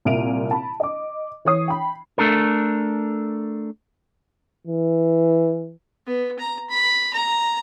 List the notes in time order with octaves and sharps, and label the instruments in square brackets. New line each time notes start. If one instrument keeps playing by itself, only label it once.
[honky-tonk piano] C2 A#2 E4 D7 D#7 F7
A5 B5
D#5 D6
E3 C#5 D#6 C7
G5 B5
[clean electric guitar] A3 D4 A4 A#4
[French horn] E3
[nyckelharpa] B3
A#5
B5
A#5